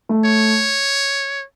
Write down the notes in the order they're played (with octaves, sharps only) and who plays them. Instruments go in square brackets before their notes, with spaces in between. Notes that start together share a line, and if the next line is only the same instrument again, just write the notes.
[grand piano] A3
[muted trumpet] C#5